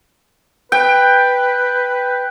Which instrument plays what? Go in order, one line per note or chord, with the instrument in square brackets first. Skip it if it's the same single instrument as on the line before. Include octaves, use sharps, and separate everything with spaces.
[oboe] B4 [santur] G5